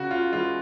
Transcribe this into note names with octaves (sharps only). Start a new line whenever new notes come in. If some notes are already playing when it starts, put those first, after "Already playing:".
Already playing: C#3 F#4
F4
E3 G#3 F4